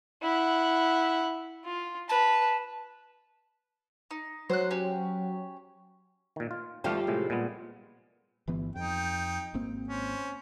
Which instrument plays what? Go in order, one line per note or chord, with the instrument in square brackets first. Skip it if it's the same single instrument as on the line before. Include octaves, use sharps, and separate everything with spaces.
[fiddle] E4 F#5
F4
[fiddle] B4 [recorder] A5
[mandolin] D#4
[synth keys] F#3 [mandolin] C5 F#6
[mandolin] C#4 G4
[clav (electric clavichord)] A#2 D#3
F4
[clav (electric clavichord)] G#1 A3 F5 [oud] F3 G3 G4
[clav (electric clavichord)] A2 C3 G#3
A#2 G#3 B3
[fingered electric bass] G1 E3 B3
[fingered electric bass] F2 [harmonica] D#4 G5
[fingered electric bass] G#1 A#3 C4
[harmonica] C#4 C5